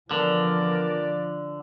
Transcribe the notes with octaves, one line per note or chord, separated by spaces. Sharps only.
D3 E3 F3 B3 A#4 D5